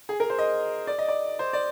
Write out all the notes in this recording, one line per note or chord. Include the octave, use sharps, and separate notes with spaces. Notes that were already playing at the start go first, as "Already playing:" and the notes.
G#4
A#4
C5
D#5
D5
D#5
D5
C5
D5